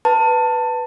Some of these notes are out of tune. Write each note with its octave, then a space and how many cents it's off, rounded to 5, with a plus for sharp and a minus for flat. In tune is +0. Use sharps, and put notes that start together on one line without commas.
B4 +0 A5 +20